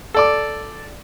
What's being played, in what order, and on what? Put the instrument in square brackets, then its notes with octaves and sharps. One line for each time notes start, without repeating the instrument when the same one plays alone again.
[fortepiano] A4 D5 D6